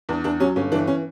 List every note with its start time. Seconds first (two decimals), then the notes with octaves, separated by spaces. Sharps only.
0.09 E2 D4
0.24 E2 D4
0.40 F#3 C#4
0.56 G1 C#4
0.72 E3 D4
0.87 C#4